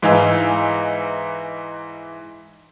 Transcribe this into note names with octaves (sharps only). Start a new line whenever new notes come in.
G#2 E3 D#4 F5 G#5 E6